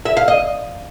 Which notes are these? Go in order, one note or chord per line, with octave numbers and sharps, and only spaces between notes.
E5
F5
D#5